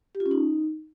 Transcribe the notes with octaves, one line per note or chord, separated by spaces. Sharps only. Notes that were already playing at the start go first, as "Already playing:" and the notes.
G4
F4
C#4
D#4